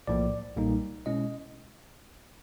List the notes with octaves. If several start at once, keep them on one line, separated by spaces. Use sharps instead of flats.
B1 A2 F3 A#3 D5
B1 A#2 G3 A#3 D#4
B2 G#3 C#4 E4 D#5